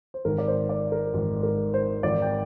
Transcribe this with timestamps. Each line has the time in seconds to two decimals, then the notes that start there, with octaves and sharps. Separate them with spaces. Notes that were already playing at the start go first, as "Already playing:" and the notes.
0.14 C5
0.25 G#1 G#2 D#3 A#4
0.38 D5
0.48 C5
0.69 D5
0.92 A#4
1.14 G#1 G#2 D#3
1.43 A#4
1.74 C5
2.03 G#1 G#2 D#3 D5
2.22 G5